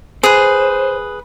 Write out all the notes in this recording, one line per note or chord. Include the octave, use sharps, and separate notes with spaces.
G#4 B4 C5